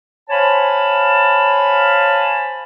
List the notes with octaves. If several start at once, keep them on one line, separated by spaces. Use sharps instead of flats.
C5 C#5 F5 G#5 A5 B5